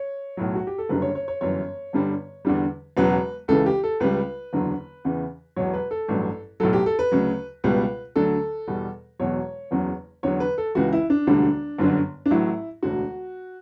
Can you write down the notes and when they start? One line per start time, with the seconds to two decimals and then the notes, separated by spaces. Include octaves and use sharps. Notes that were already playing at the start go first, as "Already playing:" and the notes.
Already playing: C#5
0.37 B1 A2 F#3
0.55 F#4
0.67 G4
0.78 A4
0.89 F#1 F#2 D3 G3 B4
1.02 C#5
1.15 C#5
1.28 C#5
1.41 G1 F#2 E3 C#5
1.93 G1 G2 D3 G3
2.45 E2 D3 G3
2.97 E1 E2 C#3 F#3 B4
3.48 C#2 C#3 E3 A4
3.66 G4
3.84 A4
4.00 C#2 C#3 G3 B4
4.53 F#1 E2 D3 F#3
5.05 E2 C#3 E3
5.56 E1 E2 B2 F#3 C#5
5.73 B4
5.91 A4
6.08 A1 G2 F#3
6.60 B1 A2 F#3 A4
6.73 G4
6.86 A4
6.99 B4
7.12 D2 C#3 F#3
7.64 C#2 B2 G3 B4
8.16 D2 D3 F#3 A4
8.67 E2 B2 G3
9.19 E1 E2 B2 F#3 C#5
9.71 F#1 E2 C#3 F#3
10.23 E2 D3 F#3 C#5
10.40 B4
10.58 A4
10.75 C#2 C#3 E3 F#4
10.93 E4
11.10 D4
11.27 E1 D2 D3 G3
11.78 G1 F#2 D3 F#3
12.26 D4
12.30 A1 A2 F#3 E4
12.82 E1 D2 D3 F#4